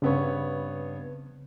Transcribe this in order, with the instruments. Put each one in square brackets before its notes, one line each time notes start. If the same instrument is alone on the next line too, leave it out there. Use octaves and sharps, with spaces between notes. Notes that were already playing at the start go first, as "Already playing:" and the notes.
[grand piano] G2 B3 C#5 [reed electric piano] C#3 C4